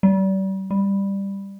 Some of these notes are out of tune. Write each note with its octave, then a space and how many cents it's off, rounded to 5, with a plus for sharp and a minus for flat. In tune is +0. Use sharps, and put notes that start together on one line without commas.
G3 -35
G3 +10